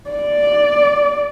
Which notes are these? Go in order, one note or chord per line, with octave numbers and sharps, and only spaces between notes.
D5